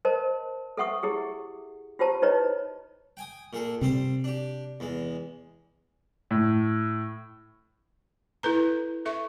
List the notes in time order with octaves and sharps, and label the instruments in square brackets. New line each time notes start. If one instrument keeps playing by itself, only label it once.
[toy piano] A#4 C5 D#5 A5
A4 E5 F#5 C#6 D#6
E4 G4 G#4
F4 G4 C5 A5 A#5
D#4 E4 B4 C#5 D#5 A#5
[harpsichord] G5 G#5 D#6
A#2 G#4 A4
[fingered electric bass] C3 [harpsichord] G3 C4 C5
[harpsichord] D4 G4
E2 G#3
[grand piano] A2
[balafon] E4 A4 B4 A#5
A4 E5 C#6